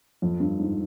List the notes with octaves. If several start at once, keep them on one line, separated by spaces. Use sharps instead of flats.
F2
G2
G#2